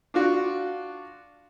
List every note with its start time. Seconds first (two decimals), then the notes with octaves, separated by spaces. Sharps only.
0.14 D4 F4 F#4